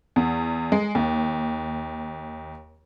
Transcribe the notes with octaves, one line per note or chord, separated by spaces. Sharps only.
E2
G#3
D#2